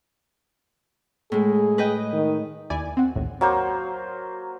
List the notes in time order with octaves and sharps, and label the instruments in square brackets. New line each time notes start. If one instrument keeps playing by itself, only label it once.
[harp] A2 G#3 [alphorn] G#4
[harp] B4 D#5 G5
[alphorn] D#3
[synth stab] D#2 E4 D5 G#5
C4 F#4
A#1 D#2 A2
[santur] F#3 A#3 C5